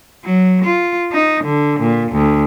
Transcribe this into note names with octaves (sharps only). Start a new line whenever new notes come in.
F#3
F4
D#4
D3
A#2
D2